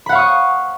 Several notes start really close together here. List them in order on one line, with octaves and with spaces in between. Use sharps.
B5 F#5 F5 C#6 D#6